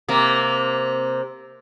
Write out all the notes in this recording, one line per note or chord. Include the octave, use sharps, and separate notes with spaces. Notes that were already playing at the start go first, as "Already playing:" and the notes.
C3 A#3